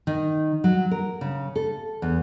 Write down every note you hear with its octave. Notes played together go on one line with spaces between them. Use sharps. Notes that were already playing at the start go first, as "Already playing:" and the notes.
D#3
F#3
A#4
C#3
A4
E2